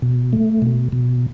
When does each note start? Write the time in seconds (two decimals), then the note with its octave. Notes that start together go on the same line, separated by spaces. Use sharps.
0.02 B2
0.33 A3
0.62 B2
0.92 B2